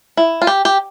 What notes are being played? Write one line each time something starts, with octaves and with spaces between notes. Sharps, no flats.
E4
F4
G4
G4